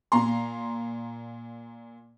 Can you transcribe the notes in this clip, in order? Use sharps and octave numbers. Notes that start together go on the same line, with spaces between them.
A#2 A#5 C6